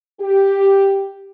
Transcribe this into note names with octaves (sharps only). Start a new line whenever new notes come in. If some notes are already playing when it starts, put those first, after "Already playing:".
G4